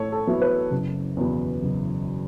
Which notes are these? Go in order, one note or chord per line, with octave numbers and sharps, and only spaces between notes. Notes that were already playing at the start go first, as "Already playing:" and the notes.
Already playing: A2 A4 C#5
A4
F#3 B3 E4
B4
F#1
E2 B2 B3
F#1